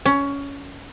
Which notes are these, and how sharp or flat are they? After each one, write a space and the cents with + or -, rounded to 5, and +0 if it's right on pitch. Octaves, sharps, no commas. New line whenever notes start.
C#4 +15